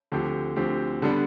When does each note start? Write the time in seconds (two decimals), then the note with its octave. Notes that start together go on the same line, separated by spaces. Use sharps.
0.12 D2 D3 F3 C4 G4
0.56 D2 D3 F3 C4 G4
1.02 D3 G3 B3 D4